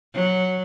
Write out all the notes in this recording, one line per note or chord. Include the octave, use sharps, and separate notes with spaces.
F#3